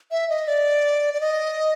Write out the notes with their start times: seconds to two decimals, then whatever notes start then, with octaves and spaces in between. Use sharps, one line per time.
0.11 E5
0.29 D#5
0.48 D5
1.14 D5
1.21 D#5